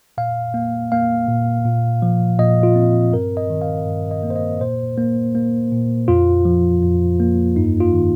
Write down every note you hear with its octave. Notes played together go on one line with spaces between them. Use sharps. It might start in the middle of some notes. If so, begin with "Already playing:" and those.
A#2 F5
A#3 F5
A#3 F5
A#2
A#2
F3
A#2 D#5
F4
C4
G2 A#4
D#5
D#3
F5
G2
D#5
A#3
C5
D#5
A#2 C5
A#3
A#3
A#2
F2 F4
F3
F2
A#3
G2 D#4
F4
D#3